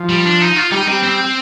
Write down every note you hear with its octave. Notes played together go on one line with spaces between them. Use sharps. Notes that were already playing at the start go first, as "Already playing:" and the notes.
Already playing: F3
G3
D4
D#4
F4
G3 D#4
G3 C4
C4